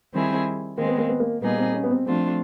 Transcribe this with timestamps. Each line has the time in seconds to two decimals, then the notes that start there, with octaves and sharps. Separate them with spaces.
0.13 D#3 G3 C4 E4 G#4
0.78 D#3 G#3 A#3 C4
0.88 B3
0.98 A#3
1.09 B3
1.20 A#3
1.42 A#2 G3 A#3 B3 D#4 G#4
1.58 C4
1.74 C#4
1.84 B3
1.90 C4
2.06 F3 A3 C4 D4 F4